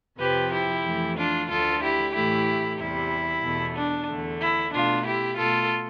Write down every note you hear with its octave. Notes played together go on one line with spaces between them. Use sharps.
F2 C3 F3 G4 B4
E4 G4
F2 E3 A3
D4 F4
D2 D3 A3 F4 A4
E4 G4
A2 E3 A3 E4 G4
E2 C3 G3 E4
E2 B2 A3
D4
E2 D3 A3
E4
B2 A3 D4 F4
E4 G4
B2 A3 F4 A4